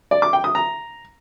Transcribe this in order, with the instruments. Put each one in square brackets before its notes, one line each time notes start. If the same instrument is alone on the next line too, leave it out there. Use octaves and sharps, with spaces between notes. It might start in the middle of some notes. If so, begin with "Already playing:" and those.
[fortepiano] D5
D6
G5
D#6
A#5